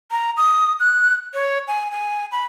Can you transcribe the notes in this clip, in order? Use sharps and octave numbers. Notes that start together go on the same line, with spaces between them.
A#5
D#6
F#6
C#5
G#5
G#5
B5